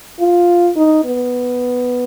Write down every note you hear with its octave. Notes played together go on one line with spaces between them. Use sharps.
F4
D#4
B3